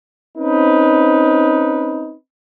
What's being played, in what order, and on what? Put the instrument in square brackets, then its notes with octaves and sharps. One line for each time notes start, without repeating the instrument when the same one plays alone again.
[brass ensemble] C4 C#4 D#4 B4